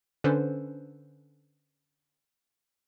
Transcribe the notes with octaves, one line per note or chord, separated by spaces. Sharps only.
D3 C#4 D4 A4 B4 C5